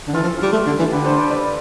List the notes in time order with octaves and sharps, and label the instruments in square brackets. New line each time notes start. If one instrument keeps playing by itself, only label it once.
[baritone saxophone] D3
[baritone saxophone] E3 [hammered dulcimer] F4 A4
[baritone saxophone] F3
G3
A3
D3
E3
[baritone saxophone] D3 [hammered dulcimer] G4 B4
[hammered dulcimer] A4 C5
B4 D5
B4 D5